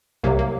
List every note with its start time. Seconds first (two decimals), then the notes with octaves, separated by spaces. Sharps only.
0.24 C2 C3 F#3 A#3
0.39 A#3